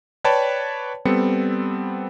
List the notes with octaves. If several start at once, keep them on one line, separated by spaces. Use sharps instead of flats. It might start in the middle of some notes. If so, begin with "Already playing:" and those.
B4 C#5 D5 G5 A5 B5
G3 B3 C4 A4 C#7